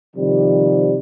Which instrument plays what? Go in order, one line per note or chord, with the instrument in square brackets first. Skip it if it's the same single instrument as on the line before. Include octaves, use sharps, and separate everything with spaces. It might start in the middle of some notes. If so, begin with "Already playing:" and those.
[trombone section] C3 D#3 F3 G3